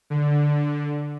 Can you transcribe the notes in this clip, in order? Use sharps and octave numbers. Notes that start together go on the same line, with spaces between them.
D3